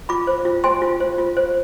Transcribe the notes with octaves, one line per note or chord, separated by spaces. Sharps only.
F4 B5 D6
C5
F4
C5 G#5 C6
F4
C5
F4
C5